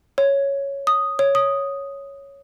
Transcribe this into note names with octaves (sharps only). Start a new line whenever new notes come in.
C#5
D#6
C#5
D#6